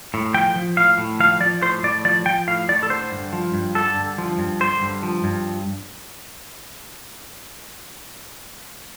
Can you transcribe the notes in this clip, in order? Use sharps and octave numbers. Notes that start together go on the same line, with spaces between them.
A2
F3 G5
F3
A2 F5
A2
F3 F5
F3 D5
A2 C5
A2 D5
F3 D5
F3 G5
A2 F5
A2 D5
A4
D3 C5
G2
F3
G2
D3 A4
G2
F3
G2
D3 C5
G2
F3
G2